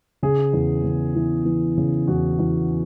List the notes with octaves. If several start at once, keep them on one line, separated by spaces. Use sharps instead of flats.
C#3 G#4
E2
C#3
E3
E3
C#3
E2 F#4
E2